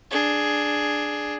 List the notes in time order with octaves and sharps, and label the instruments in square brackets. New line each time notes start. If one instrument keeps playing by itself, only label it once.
[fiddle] D4 G#4